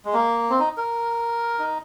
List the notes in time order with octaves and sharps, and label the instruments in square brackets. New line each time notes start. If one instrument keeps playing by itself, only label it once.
[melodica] G#3
A#3
C4
D#4
A#4
D#4